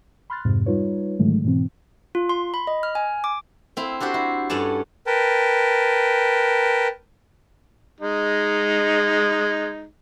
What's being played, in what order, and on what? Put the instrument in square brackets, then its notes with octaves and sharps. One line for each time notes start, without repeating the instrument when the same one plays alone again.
[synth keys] B5 C6 F6 F#6 A6
F2 G#2 C3
G3 D#4 F4 B4 C#5
G#2 D3 D#3 F#3 G#3 A3
G#2 B2 E3 C4
[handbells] F4
C6
B5
D#5
F6
G#5
D6
[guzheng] C4 E4 F5
D4 F#4 G4 C5
E4
G2 C#4 A4 D5 F#5 A5
[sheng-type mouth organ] A#4 B4 G5 A5
[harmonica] G#3 D#4